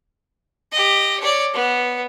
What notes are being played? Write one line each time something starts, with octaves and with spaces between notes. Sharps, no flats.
G4 D#5
C#5 D5
B3